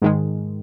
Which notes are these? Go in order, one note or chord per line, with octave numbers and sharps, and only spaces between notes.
G#2 D#3 G#3